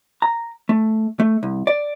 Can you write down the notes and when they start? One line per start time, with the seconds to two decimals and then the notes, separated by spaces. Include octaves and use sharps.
0.22 A#5
0.69 A3
1.20 A3
1.43 C2
1.67 D5